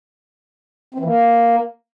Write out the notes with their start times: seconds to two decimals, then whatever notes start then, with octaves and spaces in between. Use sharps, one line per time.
0.94 C4
1.00 E3
1.05 A#3